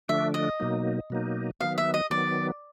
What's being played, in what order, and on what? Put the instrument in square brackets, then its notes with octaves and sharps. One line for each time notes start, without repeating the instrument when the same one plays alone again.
[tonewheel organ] D3 F3 A3 D4 [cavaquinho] E5
[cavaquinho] D#5
[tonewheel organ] B2 F#3 A#3 D#4
B2 F#3 A#3 D#4
[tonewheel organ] D#3 F#3 B3 [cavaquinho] F5
[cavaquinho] E5
D#5
[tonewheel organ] D#3 F#3 B3 [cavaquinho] D5